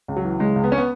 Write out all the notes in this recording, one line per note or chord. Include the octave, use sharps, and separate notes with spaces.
C#2
F#3
E3
C#3 G#3
C#2
B3
C#4
B3